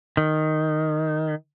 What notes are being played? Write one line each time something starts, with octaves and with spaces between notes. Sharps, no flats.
D#3